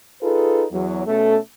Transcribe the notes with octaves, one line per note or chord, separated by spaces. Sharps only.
D#4 F4 G#4 A4 B4
E2 F#3
B2 A3 C#4 A4